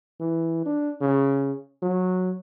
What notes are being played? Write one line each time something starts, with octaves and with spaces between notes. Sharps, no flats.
E3
D4
C#3
F#3